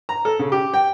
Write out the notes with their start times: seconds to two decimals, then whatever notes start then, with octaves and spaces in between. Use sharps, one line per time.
0.09 A#5
0.25 A4
0.39 C#3
0.52 G4
0.74 G5